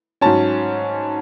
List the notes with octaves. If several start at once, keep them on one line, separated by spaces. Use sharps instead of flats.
G#2 F#3 C#4 A5